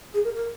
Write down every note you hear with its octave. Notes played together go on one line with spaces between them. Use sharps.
G#4
A#4
A#4